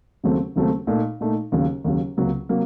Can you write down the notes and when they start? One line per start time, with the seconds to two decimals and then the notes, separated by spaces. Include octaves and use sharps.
0.24 D#2 C#3 F#3 A3 C4
0.56 D#2 C#3 F#3 A3 C4
0.87 A#2 A3 D#4
1.21 A#2 A3 D#4
1.52 D#2 C#3 F#3
1.84 D#2 C#3 F#3
2.17 C#2 C3 F#3 A#3
2.49 C3 F#3 A#3